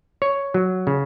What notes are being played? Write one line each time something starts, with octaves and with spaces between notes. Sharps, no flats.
C#5
F#3
C#3